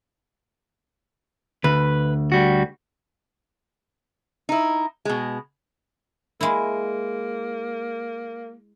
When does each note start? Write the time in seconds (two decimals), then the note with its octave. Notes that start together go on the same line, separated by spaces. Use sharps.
1.64 D2 B4
2.32 G3 F#4
4.49 D#4 E4
5.05 B2 G#3
6.41 G#3 A#3 E4